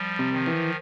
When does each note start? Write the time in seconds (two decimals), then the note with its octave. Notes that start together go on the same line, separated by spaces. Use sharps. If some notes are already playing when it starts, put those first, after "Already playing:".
Already playing: F3 G3
0.19 C3
0.33 D#3 F3
0.47 E3